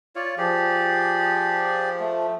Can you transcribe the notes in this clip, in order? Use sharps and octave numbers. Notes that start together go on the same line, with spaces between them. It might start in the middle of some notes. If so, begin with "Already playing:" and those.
F4 C#5 D5
F3 G4 G#4 D5
A3